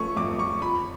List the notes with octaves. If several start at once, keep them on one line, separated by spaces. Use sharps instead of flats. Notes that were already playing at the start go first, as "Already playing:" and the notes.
Already playing: F3 A3 C#4 C#6
F2 D6
F2 C#6
F3 B5